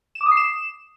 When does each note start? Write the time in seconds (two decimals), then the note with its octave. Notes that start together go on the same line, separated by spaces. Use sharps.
0.15 E7
0.21 D6
0.26 D#6
0.31 C7
0.37 E7